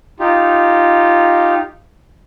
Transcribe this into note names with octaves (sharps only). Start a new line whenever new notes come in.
D#4 F4 G4